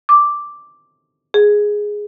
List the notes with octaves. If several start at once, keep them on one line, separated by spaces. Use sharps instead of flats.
D6
G#4